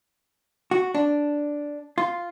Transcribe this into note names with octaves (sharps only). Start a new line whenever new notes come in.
F#4
D4
F4